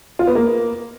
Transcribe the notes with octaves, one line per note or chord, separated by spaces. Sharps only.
F4
B3
A#3